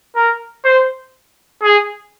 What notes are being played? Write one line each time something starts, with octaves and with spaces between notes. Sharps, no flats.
A#4
C5
G#4